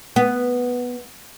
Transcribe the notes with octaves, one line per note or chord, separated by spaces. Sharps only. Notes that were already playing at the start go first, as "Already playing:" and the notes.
B3